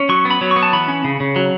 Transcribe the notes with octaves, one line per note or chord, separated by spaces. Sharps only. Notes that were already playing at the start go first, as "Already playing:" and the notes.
Already playing: C#4
F#3 C#6
B3
B5
F#3
C#6
B3
A5
E3 B5
C#4
C#3
C#3
F#3